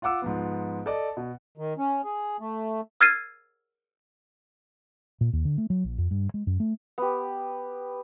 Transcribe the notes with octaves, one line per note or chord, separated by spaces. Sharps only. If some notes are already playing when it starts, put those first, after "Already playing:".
F4 F5 F#5 D6 E6
G#2 F3 B3
A4 D5 D#5
B2
D#3
C#4
G#4
A3
E6 F6 G#6 A6 C7 D#7
A#2
D#2
D3
A3
F#3
A#1
F2
G2
G#3
F#2
A3
B3 G4